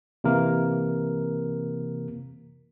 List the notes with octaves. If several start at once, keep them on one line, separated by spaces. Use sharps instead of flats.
C3 E3 A#3 A#4